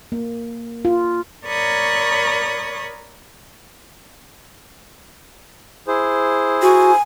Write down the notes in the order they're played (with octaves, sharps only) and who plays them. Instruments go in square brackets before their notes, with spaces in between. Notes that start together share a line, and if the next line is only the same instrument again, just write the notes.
[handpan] A#3
F4
[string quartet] A#4 C#5 D5 B5 C#6 D#6
[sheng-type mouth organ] E4 G#4 C5
[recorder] F#4 [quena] G#5